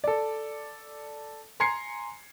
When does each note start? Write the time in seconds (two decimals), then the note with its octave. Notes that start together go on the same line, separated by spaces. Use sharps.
0.04 A4 D5
1.60 G#5 A#5 C6 G#6 C7 C#7